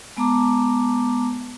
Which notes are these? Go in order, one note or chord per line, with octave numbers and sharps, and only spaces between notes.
G#3 B3 A5 A#5 D6